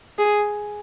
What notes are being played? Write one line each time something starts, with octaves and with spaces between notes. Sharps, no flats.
G#4